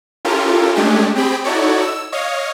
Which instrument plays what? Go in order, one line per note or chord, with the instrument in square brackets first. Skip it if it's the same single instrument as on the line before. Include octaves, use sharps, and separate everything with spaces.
[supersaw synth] C#4 E4 F4 G4 A4 A#4
G#3 A3 C#4 D4 G4 G#4
C4 G4 G#4 G5 B5
D#4 E4 F#4 A4 C#5 D5
E6
C#5 D#5 F5